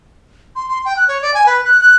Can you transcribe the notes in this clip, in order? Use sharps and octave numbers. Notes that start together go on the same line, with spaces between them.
C6
C6
G5
F#6
C#5
D5
G#5
B4
F#6
F#6